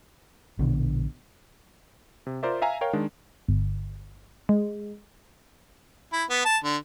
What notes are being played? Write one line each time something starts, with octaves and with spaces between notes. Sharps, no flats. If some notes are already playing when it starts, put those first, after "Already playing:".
A#1 B2 D3
C3
F4 A#4 C5 D5 E5
E5 F5 G#5 A#5
A#4 C#5 F5 G5
D#3 G#3 D4
G1
G#3
E4
B3
A5
D3